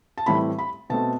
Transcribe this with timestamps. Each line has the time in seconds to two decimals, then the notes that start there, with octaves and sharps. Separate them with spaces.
0.18 A5
0.26 A2 E3 G3 C4 B5
0.59 B5
0.90 B2 A3 C4 A5